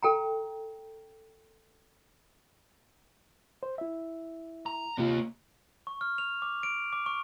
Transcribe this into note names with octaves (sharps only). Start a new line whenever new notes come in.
A4 G5 A#5
C5
E4 E5
A#5
C3 A#3 F4 G4
C#6
F6
F7
D6
D7
D6
C#6